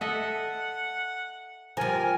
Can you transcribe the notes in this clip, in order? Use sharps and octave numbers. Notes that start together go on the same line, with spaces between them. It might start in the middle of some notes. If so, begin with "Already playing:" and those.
A4 D#5 E5 F#5
F3 G3 A#4 G#5